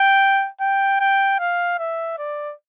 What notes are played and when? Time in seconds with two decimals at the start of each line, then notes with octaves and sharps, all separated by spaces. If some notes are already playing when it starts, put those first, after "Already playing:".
Already playing: G5
0.61 G5
1.00 G5
1.39 F5
1.79 E5
2.18 D5